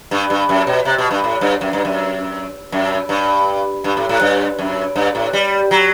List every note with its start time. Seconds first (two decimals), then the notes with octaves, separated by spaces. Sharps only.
0.11 G2
0.30 G2
0.49 F#2
0.67 B2
0.85 C3
0.98 B2
1.11 G2
1.24 A2
1.41 G2
1.61 F#2
1.73 G2
1.85 F#2
2.72 F#2
3.09 G2
3.84 G2
3.97 A2
4.09 A2
4.21 G2
4.59 F#2
4.96 G2
5.15 A2
5.33 G3
5.71 F#3